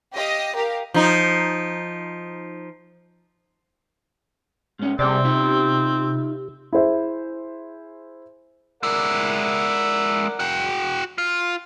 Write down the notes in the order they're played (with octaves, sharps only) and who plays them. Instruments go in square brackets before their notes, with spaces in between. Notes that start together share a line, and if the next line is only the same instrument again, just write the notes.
[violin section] G4 D#5 F5
G4 A#4 F5
[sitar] F3 D#4
[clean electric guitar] G#2 C#4
[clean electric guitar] C2 G#4 D5 [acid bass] C3 [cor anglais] C4
[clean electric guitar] D#4 F4 E5
[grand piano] E4 G#4 C5 E5
[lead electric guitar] G#3 E4 [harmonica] A#4 D5 F#5
[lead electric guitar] F#4 G5
F4